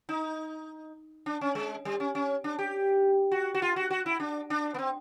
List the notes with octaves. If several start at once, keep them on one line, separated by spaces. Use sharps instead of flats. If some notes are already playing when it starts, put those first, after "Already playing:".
D#4
D4
C#4
G#3
G3
C#4
C#4
D4
G4
F#4
F#4
F4
F#4
F#4
E4
D4
D4
B3
C4